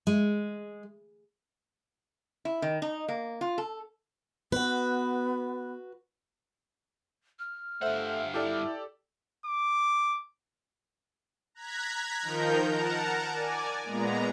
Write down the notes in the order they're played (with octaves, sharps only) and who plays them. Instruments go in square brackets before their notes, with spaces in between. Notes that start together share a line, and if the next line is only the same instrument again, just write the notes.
[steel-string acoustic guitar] G#3
[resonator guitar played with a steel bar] E4
D#3
D#4
A#3
F4
A4
[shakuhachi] B3 [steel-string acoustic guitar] F#4 B4
[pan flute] F6
[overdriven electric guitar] G2 F#5 [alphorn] A3 [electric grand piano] C5 E5
[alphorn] E4 [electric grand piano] G4 A4 D5
[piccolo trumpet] D6
[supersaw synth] A#5 F#6 G#6 B6
D#3 F3 D#4 A#4 A#5 G6
A#4 F#5 A5 A#5
D5 G#5
A#2 G#3 B3 A#5